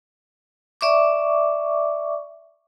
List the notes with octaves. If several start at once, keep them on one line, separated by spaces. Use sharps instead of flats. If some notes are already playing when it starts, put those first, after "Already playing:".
D5 E5 C#6 D6